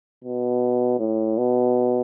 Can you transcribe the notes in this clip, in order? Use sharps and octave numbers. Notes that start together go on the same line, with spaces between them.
B2
A2
B2